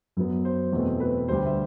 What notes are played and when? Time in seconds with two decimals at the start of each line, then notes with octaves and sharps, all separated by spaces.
0.17 F#2 F#3 B3
0.45 C5
0.72 E2 B2 A3 C4
1.00 B4
1.28 D2 D3 G3 C5
1.46 E5